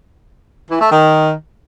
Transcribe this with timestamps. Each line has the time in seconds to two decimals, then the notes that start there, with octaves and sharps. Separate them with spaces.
0.71 E3
0.81 A3
0.92 D#3